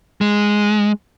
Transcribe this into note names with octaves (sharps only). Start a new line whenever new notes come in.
G#3